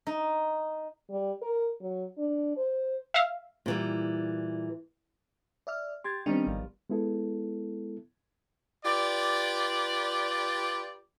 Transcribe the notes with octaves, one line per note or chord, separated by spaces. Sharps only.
D#4
G3
A#4
F#3
D4
C5
E5 F5
A#2 E3 G3
D5 E5 F6
G4 C6 G#6 A6
D#3 G3 B3 C4 D4
G#1 F3
G#3 B3 E4 A4
F4 G4 B4 D5